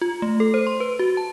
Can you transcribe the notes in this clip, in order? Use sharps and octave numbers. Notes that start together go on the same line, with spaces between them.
F4
A3
A4
C5
C6
B4
F#4
A5